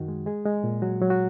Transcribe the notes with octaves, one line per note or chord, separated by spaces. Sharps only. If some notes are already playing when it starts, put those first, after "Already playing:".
Already playing: F#2 D#3 F#4
G#3
G#3 G#4
G#3
A#2
F#3 F#4
F#3
F#4